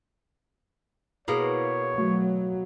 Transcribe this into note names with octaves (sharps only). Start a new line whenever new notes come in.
B2 A#3 E4 G#4 C#5
F#3 A3